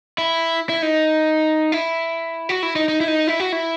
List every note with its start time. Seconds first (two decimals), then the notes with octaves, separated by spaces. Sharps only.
0.18 E4
0.69 E4
0.82 D#4
1.72 E4
2.49 F#4
2.63 E4
2.76 D#4
2.89 D#4
3.00 E4
3.08 D#4
3.27 E4
3.40 F#4
3.52 E4